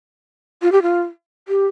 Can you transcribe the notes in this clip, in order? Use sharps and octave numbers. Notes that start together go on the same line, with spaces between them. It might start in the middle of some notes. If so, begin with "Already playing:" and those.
F4
G4
F4
G4